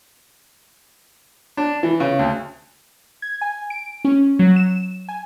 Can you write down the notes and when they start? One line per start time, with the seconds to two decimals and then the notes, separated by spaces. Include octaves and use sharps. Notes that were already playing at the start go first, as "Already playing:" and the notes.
1.57 D4
1.83 E3
2.00 C#3
2.19 D2
3.22 G#6
3.41 G#5
3.70 D7
4.05 C#4
4.39 F#3
4.56 E7
5.09 G#5